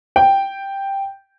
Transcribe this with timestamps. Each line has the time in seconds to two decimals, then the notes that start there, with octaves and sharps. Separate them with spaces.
0.16 G5